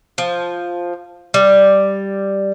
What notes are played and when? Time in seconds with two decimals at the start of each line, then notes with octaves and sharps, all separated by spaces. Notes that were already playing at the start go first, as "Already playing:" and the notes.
0.18 F3
1.34 G3